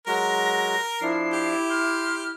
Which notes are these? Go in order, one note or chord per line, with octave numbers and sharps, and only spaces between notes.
F#3 G#3 F#4 A#4 A#6
F3 D4 E4 C7
G4
C6 F6 G6